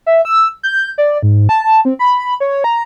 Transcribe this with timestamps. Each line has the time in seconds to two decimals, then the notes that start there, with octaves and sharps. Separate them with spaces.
0.06 E5
0.25 E6
0.63 G6
0.98 D5
1.23 G#2
1.49 A5
1.85 C4
1.99 B5
2.40 C#5
2.64 A#5